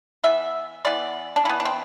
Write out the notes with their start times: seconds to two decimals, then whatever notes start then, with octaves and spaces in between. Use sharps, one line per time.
0.24 E3 B3 E5
0.85 E3 B3 D5
1.36 D4
1.45 E3 B3 E4
1.60 D4
1.65 C4